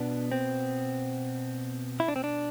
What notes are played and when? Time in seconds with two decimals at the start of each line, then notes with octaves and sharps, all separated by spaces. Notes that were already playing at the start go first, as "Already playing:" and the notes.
Already playing: B2 B3 D4
0.32 C4
2.00 E4
2.08 D4
2.16 C4
2.24 D4